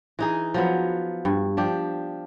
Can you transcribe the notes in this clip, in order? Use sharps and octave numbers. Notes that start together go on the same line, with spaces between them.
E3 D#4 G#4
F3 F#3 B3
G2
F3 D4 G4